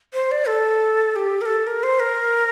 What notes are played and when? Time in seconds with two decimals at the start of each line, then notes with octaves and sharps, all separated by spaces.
0.13 C5
0.31 D5
0.47 A4
1.16 G4
1.41 A#4
1.46 A4
1.67 A#4
1.83 C5
2.00 A#4